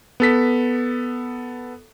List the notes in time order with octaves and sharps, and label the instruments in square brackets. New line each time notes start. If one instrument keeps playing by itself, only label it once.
[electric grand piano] B3 A4 B6